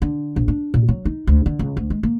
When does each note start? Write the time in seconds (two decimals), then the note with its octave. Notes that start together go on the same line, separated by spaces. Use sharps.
0.02 D3
0.36 A#1
0.48 D4
0.74 A#2
0.88 F#3
1.05 D#4
1.27 D2
1.46 D3
1.59 C#2
1.77 D2
1.90 G#3
2.03 A#3